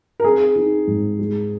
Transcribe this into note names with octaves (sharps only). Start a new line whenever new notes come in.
A#4
C4 G#4
D#4
G#2
G#3